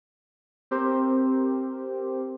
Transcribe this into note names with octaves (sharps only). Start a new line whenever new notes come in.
C4 G4 A#4 C5